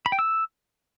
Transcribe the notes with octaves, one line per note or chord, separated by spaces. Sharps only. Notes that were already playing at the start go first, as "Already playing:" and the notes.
B5
G5
E6